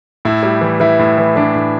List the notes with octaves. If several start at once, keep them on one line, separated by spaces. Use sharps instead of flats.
A2 E4
G3
E3
E3 E4
A2
E3
E3 D4
A2